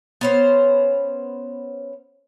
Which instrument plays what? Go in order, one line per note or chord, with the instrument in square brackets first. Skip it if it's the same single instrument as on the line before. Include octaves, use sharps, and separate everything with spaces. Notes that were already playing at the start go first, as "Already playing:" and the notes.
[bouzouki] B3 C#4 C5